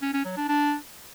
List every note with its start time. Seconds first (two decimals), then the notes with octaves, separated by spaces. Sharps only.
0.02 C#4
0.13 C#4
0.25 F#3
0.37 D4
0.48 D4